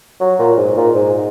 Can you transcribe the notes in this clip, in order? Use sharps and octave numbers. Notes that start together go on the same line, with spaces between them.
F#3
A#2
G#2
A#2
G#2